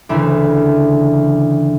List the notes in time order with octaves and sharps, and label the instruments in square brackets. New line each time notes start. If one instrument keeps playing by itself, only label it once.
[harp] D2 C#3 E3 D4 E4